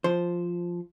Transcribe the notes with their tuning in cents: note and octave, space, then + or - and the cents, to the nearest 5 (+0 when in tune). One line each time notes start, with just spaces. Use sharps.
F3 +0 C5 +0